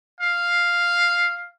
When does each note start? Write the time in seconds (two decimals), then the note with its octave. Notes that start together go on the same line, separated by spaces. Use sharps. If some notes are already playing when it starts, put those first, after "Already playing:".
0.21 F5